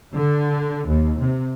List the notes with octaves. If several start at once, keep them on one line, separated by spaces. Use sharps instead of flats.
D3
D#2
C3